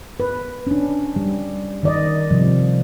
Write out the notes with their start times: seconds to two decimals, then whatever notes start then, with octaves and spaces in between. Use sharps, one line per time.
0.20 B4
0.67 C#4 D4
1.16 G3
1.83 D#3 D5 D#5
2.31 C3 F3 G3